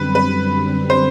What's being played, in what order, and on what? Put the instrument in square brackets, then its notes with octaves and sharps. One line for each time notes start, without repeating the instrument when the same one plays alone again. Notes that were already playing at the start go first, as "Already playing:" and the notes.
Already playing: [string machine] F#2 D3 G3 C4 [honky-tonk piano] B4
[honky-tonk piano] B4
C5